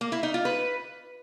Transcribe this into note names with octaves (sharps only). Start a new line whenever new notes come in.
A#3
E4
D#4
F4
B4